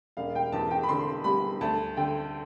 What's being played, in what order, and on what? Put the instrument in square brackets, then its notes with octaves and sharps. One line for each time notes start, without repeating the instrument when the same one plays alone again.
[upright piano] E1 F5
G5
E2 A5
G5
B5
D3 C6
G3 B5
D2 A5
D3 G5